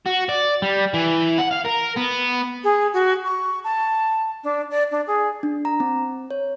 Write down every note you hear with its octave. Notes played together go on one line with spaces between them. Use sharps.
F#4
D5
G3
E3
F#5
F5
A#4
B3
G#4
F#4
C#6
A5
D4
D5
D4
G#4
D4
A#5
C4
C#5